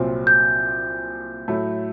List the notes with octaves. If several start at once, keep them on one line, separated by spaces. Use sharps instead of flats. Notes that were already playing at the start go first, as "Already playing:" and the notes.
Already playing: C2 A#2 F#3 C4
G6
A2 F#3 A3